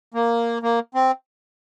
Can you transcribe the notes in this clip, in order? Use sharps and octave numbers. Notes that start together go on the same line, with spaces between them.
A#3
A#3
C4